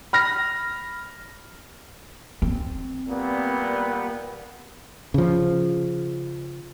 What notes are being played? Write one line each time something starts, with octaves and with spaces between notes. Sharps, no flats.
B5 F6 A#6
C4
A#2 G3 B3
C#3 F3